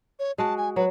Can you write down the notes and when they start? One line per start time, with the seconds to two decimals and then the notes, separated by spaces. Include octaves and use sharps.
0.19 C#5
0.38 G#3 F#4 A5
0.57 G#5
0.76 F#3 B4